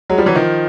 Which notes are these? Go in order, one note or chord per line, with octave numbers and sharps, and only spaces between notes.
F#3 G#3
F3 G3
E3 F#3
D#3 F3